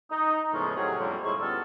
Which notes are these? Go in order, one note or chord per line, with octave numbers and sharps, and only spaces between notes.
D#4
E2 A2 C#3 F3 G#3 C#4
A2 C3 F#3 C#4 F#4 G#4
F2 D3 G3 A#3 C4 C#4
A2 G#3 D#4 E4 C6 C#6
C#2 G3 B3 A4 E6 F6